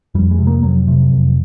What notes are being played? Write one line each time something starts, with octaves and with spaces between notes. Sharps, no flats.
F2 G3
G#3
C3
A#3
F2 F#3
C3
F2